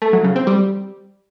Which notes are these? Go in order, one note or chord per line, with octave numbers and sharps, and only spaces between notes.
A3
F#3
C#3
C4
G3